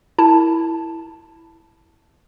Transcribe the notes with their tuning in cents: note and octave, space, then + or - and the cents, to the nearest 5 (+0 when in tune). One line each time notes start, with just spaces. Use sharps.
E4 +0 A#4 +0 A5 +0